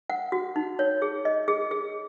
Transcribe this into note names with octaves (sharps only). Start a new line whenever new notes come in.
F#5
F#4
D#4
C#5
G#4
D#5
G#4
G#4